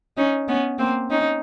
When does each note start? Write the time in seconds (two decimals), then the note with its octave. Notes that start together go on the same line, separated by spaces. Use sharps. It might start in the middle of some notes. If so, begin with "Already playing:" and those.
0.17 C#4 D#4
0.48 B3 C#4
0.79 A#3 C4
1.10 C#4 D#4